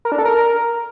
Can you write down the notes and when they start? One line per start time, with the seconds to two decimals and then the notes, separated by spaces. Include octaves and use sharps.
0.05 A#4
0.12 D4
0.18 A4
0.25 A#4